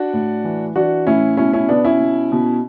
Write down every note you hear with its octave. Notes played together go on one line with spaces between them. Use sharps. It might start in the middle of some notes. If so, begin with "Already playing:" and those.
Already playing: D4 F#4
A2
E3
E3 D4 F#4
A2 C#4 E4
B2 C#4 E4
C#4 E4
B2 B3 D4
C#4 E4
B2
B2